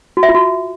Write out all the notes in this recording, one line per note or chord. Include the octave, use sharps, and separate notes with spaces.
F#4
E5
F4
F#4